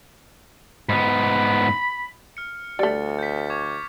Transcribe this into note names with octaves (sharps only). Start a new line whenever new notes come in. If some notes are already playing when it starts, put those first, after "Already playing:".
G#2 B3 B5
F6 C#7
D2 G3 A3 A6 C#7
G6 B6
C#6 D6 G#6